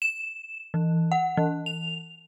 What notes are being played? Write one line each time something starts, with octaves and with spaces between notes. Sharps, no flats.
E7
E3
F#5
E3
F7